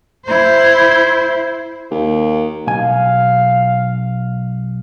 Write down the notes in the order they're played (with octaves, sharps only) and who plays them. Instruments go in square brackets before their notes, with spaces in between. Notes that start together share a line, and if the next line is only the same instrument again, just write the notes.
[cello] E4 C5
[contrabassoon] D#2
[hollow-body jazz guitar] B1 G#5 [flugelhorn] F5